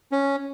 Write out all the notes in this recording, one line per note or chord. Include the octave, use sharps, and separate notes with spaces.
C#4